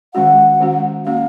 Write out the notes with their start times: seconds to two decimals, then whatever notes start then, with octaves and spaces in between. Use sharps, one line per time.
0.14 D#3 G#3 C#4 F#4 F#5
0.60 D#3 G#3 C#4 F#4
1.06 A#3 C#4 F#4 F5